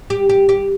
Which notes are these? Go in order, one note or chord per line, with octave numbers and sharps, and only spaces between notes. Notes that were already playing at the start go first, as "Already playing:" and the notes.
G4
G4
G4